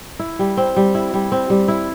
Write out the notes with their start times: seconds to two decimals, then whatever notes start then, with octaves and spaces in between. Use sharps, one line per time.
0.19 E4
0.39 G3
0.57 C4
0.76 G3
0.95 E4
1.14 G3
1.32 C4
1.50 G3
1.68 E4